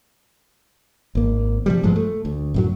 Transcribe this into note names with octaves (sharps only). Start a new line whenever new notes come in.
G#1 A#3
C3 F3 G3
A1 G2 F3 G#3
A3
D2
F#2 A2 F#3